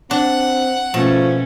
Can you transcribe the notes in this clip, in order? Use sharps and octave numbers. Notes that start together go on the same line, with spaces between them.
C4 D4 F#5
B2 F3 A3 C#4